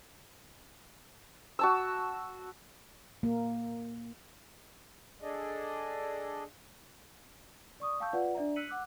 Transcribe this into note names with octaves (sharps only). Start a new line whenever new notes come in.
F#4 A5 E6
A#3
D4 G#4 A4 D5 D#5
D5 C#6 D#6
F5 G5 A5 C#6 E6 G6
F4 B4 D5 F#5
D4 D5 E5 A#5
E6 F#6 B6 C#7 D#7 F#7
F#5 D6 E6 F#6